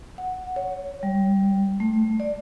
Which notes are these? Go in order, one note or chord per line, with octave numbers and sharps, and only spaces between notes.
F#5
C#5
G3
A3
D5